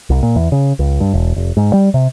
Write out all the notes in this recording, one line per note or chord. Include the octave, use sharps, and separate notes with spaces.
C2
A#2
E2
C#3
C#2
G2
E1
F1
G#2
G3
C3